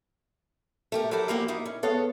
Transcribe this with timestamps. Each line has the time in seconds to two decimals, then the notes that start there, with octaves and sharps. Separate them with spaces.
0.92 A3 G4 A#4
1.11 F#3 E4 G4 A4 A#4
1.28 E3 F3 A#3 E4 F#4 G4
1.48 A#3 D#4 E4
1.66 C#4
1.83 G#3 B3 A4 C#5 F5 F#5